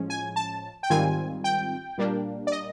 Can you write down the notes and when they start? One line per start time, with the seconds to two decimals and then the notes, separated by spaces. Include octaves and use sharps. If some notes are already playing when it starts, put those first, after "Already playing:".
Already playing: A2 F3 G#3 C#4
0.10 G#5
0.36 A5
0.83 G5
0.90 G#2 D#3 G3 C4 F4 G#5
1.44 G5
1.98 A#2 G3 A#3 D4
2.47 D5
2.52 D#5